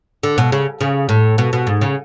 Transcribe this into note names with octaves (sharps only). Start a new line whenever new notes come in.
D3
B2
C#3
C#3
A2
B2
B2
G#2
C#3